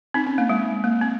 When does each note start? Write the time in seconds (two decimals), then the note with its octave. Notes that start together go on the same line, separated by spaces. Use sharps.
0.14 C4 D#4
0.26 C#4
0.38 A#3
0.49 G#3
0.84 A#3
1.01 C4